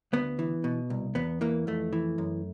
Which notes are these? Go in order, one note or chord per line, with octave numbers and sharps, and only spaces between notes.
D2 B3
E3
B2
C2
E2 B3
E3 A#3
F2 A3
E3
F#2